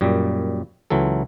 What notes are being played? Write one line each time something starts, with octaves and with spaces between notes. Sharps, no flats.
F#2 A#2 G3
C#2 E3 F#3 A4